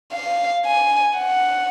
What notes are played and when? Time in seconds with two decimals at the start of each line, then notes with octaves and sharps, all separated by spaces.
0.13 F5
0.65 G#5
1.17 F#5